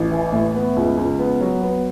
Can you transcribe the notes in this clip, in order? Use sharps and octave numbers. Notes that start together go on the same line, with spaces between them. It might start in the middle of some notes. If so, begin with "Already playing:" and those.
Already playing: A1
E3
A2
B3
C#2
C#2
B3
F#3
B3